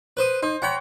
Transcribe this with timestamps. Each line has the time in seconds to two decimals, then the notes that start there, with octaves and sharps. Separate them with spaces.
0.17 B4 C5 D#6
0.43 D#4 C5
0.62 C#5 F#5 G5 A#5 B5